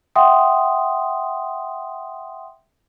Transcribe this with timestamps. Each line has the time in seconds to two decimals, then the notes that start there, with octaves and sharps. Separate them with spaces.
0.16 E5 F#5 G5 C6 D#6